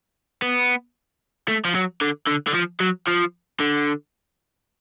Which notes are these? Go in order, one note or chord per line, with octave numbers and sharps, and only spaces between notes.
B3
A3
F3
F#3
D3
D3
D3
F3
F#3
F3
D3